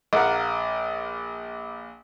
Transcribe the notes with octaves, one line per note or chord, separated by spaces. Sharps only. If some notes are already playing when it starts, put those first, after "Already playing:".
A#1 A#3 A#4 F#5